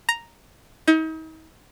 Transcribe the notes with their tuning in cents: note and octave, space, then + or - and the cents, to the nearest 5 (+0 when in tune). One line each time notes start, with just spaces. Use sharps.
A#5 +0
D#4 +40